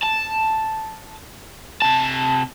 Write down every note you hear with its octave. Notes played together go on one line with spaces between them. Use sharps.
A5
C3 A5